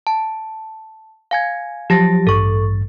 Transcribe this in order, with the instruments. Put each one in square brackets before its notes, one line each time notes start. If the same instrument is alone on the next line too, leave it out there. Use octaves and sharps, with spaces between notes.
[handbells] A5
F5 G#5 G#6
[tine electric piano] F3 F#3 A6 [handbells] G4 A5 A#6
[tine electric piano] A1 G2 A6 [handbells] A4 C#6